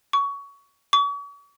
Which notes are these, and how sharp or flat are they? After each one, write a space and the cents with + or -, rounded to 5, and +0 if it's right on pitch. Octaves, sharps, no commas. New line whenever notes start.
C#6 +20
C#6 +45